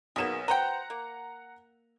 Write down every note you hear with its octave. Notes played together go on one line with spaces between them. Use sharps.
B1 A#3 B3 D#4 G#4 E7
B4 C5 F#5 G5 A#5
A#3